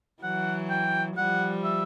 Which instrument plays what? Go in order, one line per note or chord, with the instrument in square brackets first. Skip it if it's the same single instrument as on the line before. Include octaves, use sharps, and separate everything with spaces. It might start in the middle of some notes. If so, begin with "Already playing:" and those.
[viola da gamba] E3 F#3 [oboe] F#5
[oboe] G5
[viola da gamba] F3 G3 [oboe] F#5
[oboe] E5